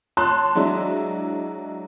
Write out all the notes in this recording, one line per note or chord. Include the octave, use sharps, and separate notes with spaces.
C#5 A5 C6 F#6
F#3 G#3 D4 E4